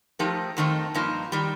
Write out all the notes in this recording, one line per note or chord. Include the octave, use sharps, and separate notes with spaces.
F3 A3 D#4 G4 A#4
F2 D#3 A3 C4 D#4
G2 F3 A#3 D#4
D#3 G3